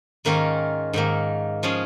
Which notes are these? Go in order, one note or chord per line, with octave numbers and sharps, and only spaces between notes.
G#2 D#3 A#3 C#4 F4
G#2 D#3 A#3
F3 C#4 F4 G#4